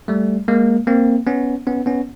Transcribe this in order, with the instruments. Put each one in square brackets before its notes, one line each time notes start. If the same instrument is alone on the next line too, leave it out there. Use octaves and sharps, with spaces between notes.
[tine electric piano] G3 A3
G#3 A#3
A#3 C4
B3 C#4
B3 C#4
B3 C#4